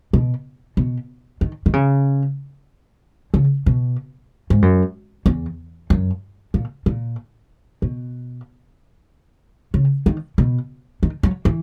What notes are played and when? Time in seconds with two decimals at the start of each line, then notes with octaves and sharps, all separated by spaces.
0.13 B2
0.77 B2
1.41 D#3
1.66 D#3
1.73 C#3
3.34 C#3
3.66 B2
4.50 G#2
4.62 F#2
5.26 E2
5.90 F#2
6.54 A#2
6.86 A#2
7.82 B2
9.74 C#3
10.06 D#3
10.38 B2
11.03 D#3
11.23 F#3
11.45 E3